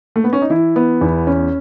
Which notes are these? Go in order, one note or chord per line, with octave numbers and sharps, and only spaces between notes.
A3
B3
C#4
D#4
E3 E4
B3
E2
C#4